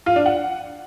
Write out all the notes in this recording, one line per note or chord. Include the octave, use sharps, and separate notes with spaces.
F4
D4
F#5